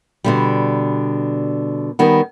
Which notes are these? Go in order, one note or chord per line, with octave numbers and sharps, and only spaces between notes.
B2 D3 G3
D#3 G3 B3